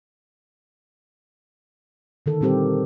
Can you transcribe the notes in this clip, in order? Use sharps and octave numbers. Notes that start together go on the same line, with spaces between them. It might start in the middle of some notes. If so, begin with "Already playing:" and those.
D3 D#3 A4
A#2 G3 C4 G4 A#4 C5